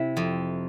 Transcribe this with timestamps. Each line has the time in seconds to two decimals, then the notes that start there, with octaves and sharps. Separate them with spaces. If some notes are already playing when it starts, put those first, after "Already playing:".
Already playing: C3 E4
0.17 F2